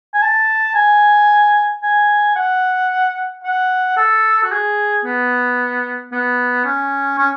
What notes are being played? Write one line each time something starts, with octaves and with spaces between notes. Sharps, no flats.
G#5
A5
G#5
G#5
F#5
F#5
A4
F#4
G#4
B3
B3
C#4
C#4